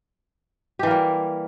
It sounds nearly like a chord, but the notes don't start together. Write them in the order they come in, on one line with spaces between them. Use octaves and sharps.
G4 E3 A#3 G3